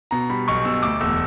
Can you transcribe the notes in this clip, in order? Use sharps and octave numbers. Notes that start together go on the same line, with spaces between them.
B2 A#5
G3 B5
B1 C#6
B2 E6
D2 D6
E1 E6